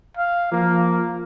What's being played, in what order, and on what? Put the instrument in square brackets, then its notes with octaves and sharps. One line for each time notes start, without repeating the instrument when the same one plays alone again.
[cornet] F5
[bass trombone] F3 [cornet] A#3